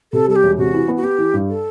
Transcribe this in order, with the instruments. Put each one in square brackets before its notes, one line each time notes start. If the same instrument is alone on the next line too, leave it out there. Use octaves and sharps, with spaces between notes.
[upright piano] C3 [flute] A4
[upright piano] G3 [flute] A4
[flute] G4
[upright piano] E1
[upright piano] C3 [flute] F#4
[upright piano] E3
B3
[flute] F#4
[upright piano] B3 [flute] G4
[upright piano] E3
G2
[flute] A4